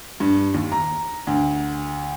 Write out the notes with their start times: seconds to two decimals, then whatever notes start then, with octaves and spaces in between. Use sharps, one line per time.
0.20 G2
0.54 D#2
0.72 A#5
1.27 D2